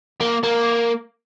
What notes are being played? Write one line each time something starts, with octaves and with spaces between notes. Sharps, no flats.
A#3
A#3